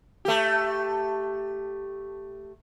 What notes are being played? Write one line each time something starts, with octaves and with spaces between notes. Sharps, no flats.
A3 G4